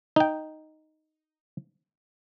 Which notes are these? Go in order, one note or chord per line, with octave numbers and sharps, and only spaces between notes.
D#4 G5